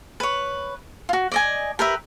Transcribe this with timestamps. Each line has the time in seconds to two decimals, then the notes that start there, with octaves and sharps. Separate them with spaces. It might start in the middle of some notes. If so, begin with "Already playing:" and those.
0.20 B4 C#5
1.09 F4 F#4
1.32 D5 D#5 G#5
1.79 G4 A#4 B4 E5